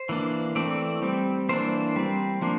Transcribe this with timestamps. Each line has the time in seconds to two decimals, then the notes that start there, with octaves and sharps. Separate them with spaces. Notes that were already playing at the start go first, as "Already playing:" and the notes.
Already playing: C5
0.09 E3 A#3 D4
0.55 E3 A3 C4 D5
1.02 G3 C4
1.49 E3 A#3 D4 C5
1.96 G3 C4
2.42 F3 A#3 D4